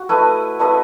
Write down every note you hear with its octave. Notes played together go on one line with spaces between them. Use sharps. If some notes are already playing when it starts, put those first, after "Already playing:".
Already playing: F#4
A3 E4 B4 D#5
A3 E4 B4 D#5